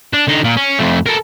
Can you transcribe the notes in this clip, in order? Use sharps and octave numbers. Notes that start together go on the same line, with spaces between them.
D4
D3 D#4
A#2
C#4
F2 A3
A4 A#4